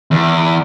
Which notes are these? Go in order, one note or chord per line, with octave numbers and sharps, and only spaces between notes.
E2